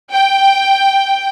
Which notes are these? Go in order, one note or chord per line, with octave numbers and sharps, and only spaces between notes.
G5